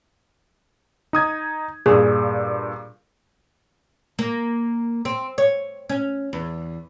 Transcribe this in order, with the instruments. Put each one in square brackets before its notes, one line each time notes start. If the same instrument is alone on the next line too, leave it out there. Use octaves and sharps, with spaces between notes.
[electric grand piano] D#4 D#6 G#6
[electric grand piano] G2 A#2 [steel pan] G#4
[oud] A#3
C4
C#5
C#4
E2